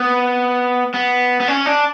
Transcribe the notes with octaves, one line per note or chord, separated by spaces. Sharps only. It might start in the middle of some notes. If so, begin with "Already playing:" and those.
Already playing: B3
B3
B3
C#4
D4